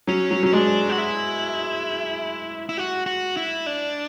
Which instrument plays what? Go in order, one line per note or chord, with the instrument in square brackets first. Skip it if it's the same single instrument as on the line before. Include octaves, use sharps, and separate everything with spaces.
[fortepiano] F#3 [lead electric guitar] C#4
[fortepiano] F#3
[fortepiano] F#3 [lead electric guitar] C#4
[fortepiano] G#3 [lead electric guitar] D4
[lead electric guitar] F#4
E4
E4
F#4
F#4
E4
D4